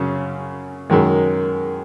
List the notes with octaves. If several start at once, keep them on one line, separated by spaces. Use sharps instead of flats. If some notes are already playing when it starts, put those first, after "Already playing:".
Already playing: F#2 C#3
F#2 D#3 G#3